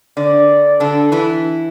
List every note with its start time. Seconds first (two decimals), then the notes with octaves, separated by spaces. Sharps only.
0.17 D3 D5
0.80 D3 D4 A4
1.12 E3 E4